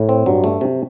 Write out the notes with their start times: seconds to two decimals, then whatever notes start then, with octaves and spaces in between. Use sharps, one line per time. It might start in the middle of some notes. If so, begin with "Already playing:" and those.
Already playing: A2
0.09 C4
0.26 G2 F#3
0.44 A3
0.61 C3